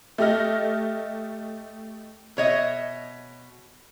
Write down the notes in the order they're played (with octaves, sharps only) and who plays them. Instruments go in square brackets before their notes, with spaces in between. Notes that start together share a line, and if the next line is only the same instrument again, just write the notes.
[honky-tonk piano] A3 G4 D#5 F6 A#6
[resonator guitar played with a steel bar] B2 C#5 D#5 E5